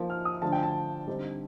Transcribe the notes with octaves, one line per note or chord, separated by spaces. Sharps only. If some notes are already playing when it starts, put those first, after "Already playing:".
Already playing: F3 A#3 D#4
F6
D#6
D3 F3 A3 D4 A5
G5
A5
D3 G3 C4 D#4